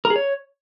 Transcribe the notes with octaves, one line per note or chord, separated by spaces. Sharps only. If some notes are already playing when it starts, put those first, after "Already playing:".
A#4
G#4
C#5